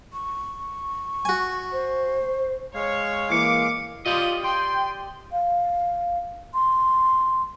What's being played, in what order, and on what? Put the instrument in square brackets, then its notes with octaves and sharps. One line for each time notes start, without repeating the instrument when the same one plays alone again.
[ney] C#6
[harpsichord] F#4 G#5
[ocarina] C5
[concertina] G#3 F5 [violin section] C#5
[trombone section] E3 A#3 [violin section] D6 [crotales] C#7
[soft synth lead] F4 [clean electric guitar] G4 D5 D#5 [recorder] D#6
[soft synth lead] G5 [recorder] C6
[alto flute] F5
C6